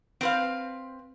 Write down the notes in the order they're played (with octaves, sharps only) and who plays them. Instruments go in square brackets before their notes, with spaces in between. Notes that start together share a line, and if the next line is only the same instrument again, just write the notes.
[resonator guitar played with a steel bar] C4 B4 F5